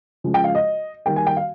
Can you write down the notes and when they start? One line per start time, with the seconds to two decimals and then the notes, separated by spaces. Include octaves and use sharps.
0.24 C#3 F3 G#3
0.34 G5
0.44 F5
0.55 D#5
1.06 D#3 G3 A#3 G5
1.16 G#5
1.27 G5
1.37 F5